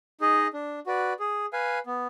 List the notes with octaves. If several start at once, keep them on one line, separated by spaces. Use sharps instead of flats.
D#4 G#4 D#5
D4
F#4 B4 D5
G#4
B4 F5 G#5
B3